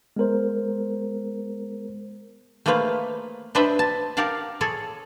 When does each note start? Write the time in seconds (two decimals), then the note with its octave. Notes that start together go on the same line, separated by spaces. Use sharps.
0.16 G#3 B3 A#4 C5
2.66 A3 A#3 G#4 B4 C5 F5
3.55 D4 G4 B4 C5 D#5 E5
3.79 A5
4.17 G4 A#4 D5 F5 F#5 A5
4.61 G#4 A4 C#5 D5